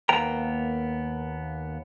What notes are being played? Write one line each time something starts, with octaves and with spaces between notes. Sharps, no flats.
D#2 A#3 B3 G5 A#5